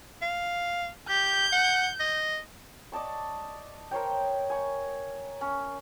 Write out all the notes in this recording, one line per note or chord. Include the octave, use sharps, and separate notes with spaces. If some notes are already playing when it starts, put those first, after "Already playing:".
F5
G4 G6
F#5
D#5
D5 D#5 A5 C#6
A#4 C5 C#5 G5
G#5 C#6
C#4